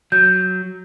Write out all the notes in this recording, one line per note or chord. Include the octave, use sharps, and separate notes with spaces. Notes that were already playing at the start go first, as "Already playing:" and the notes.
F#3 G6